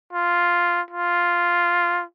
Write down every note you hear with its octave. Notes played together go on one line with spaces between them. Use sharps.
F4
F4